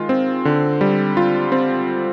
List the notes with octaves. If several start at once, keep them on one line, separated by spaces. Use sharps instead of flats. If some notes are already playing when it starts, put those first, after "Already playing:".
Already playing: D#3 G#3 F4
C4
D3
G3
F4
C4